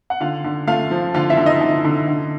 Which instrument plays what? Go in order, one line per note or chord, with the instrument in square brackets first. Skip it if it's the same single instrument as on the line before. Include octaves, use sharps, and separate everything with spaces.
[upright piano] F#5
D3 F4 F5
D3
A3 F4 F5
F3
D3 F4 F5
E4 E5
D3
D#4 D#5
D3
D3
D3